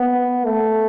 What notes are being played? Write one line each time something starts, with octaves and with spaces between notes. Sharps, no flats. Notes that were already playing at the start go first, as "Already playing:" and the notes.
Already playing: B3
A3